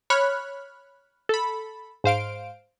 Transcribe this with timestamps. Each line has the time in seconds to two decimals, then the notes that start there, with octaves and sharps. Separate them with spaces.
0.10 C#5 B5 F6 F#6
1.29 A4 B5
2.04 G#2 C5 F5 D7